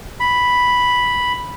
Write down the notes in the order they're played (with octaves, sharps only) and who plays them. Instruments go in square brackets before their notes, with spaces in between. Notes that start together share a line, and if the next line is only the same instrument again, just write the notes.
[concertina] B5